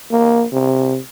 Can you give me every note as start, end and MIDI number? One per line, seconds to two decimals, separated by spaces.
0.12 0.45 58
0.52 0.98 48